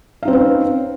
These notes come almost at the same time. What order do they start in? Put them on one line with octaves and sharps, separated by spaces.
F5 D#4 C4 C#4 B4